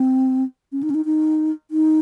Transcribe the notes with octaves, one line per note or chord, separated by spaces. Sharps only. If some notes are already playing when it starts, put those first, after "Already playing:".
Already playing: C4
C#4
D#4
C#4
D#4
D#4
D#4